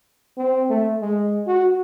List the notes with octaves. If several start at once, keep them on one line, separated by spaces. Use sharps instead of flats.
C4
A3
G#3
F#4